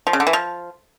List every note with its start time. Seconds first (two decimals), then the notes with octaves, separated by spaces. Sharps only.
0.07 F3
0.13 C#3
0.20 D3
0.27 E3
0.33 F3